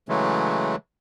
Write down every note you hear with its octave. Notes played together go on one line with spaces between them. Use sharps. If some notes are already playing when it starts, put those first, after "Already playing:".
C#3 E3 F#3 G#3 A3